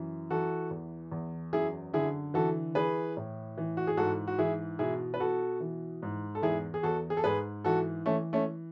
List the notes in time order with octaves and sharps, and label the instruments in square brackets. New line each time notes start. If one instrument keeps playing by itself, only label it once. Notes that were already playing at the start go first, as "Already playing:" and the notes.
Already playing: [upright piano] F#2 E3
E3 F#4 A4
E2
E2
F#2 E4 G#4
D3 E4 G#4
E3 F#4 A4
E3 G#4 B4
A2
E3
F#4
G#4
G#2 F#4 A4
F#4
E3 E4 G#4
B2 E4 G#4
B4
B2 F#4 A4
E3
G#2
A4
E2 E4 G#4
G#4
E2 F#4 A4
G#4
A4
G#2 G#4 B4
E3 F#4 A4
E3 A3 C#4
A3 C#4